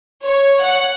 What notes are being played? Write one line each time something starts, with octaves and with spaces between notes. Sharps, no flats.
C#5
F#5